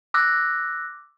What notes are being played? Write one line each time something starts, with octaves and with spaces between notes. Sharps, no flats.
D6 E6 F#6 A#6